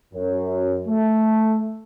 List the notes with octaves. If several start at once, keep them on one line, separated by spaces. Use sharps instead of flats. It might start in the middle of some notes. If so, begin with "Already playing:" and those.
F#2
A3